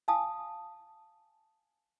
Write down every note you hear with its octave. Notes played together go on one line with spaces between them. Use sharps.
F5 G#5 A5 D#6